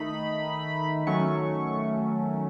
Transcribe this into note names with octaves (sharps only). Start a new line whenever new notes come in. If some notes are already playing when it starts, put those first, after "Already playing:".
Already playing: D#3 A3 D#4 B5
D#3 F#3 A3 C#4 C#6